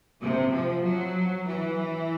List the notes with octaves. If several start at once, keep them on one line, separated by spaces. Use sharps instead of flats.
C3
F3
F#3
E3